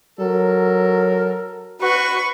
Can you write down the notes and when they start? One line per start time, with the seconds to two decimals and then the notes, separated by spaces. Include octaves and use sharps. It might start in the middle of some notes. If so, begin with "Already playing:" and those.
0.19 F#3 A4 A#4
1.81 F#4 B4 C#6